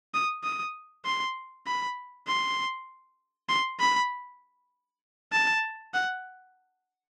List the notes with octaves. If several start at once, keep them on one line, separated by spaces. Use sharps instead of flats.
D#6
D#6
C6
B5
C6
C6
B5
A5
F#5